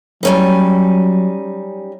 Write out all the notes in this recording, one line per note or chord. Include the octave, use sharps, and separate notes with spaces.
F#3 G3 C#4 D#4